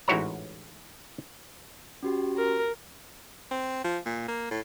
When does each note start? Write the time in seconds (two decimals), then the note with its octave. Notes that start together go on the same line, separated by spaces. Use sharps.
0.08 A1 G#2 E4 F#4 C#5 A#5
2.03 C#4 F#4 G4
2.37 A#4
3.51 C4
3.84 F3
4.06 A#2
4.28 A#3
4.51 A2